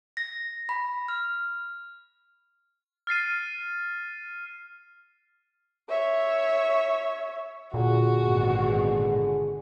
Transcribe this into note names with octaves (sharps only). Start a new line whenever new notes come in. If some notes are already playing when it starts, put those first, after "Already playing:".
A#6
B5
F6
F6 A6 C7 D#7
C#5 E5
A#2 D3 F#4 G#4
G#1 B2